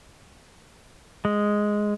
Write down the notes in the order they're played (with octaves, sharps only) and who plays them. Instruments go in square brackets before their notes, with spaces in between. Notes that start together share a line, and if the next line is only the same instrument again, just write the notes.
[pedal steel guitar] G#3